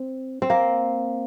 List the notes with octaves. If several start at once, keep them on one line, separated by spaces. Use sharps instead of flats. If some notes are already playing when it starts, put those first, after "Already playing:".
Already playing: C4
C4
A#3